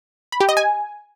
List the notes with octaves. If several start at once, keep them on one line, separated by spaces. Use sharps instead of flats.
B5
G4
D#5
G#5